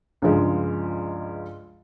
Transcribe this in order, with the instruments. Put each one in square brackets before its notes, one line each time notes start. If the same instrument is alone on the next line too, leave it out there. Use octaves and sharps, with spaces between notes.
[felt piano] C#2 G2 F3 G#3